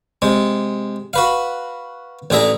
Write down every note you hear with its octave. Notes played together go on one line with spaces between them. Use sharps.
C3 G#3
F#4 B4 F5
A1 D3 G#4 E5 A#5